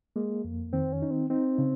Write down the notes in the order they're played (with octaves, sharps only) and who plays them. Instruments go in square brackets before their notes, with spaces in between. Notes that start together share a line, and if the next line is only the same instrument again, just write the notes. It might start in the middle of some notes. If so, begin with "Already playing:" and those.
[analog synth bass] G#3 [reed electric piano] A#3
[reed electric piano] F2
[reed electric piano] D#3 [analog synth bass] C4
[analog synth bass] C#4
[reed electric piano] D#4
[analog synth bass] C4
[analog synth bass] C4 [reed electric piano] D#4
[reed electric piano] C#3